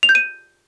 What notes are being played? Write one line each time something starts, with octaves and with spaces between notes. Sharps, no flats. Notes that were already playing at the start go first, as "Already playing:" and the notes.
F7
G6
D#7